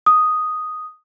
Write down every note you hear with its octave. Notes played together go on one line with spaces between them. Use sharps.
D#6